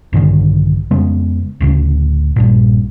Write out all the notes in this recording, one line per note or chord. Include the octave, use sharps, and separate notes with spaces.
A#1 G2 D3 D#3
F2 C#3 G#3 B3
D1 D2 C#3
A#1 G2 A#2